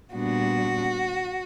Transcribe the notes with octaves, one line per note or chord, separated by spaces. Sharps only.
A#2 G3 B3 D4 F#4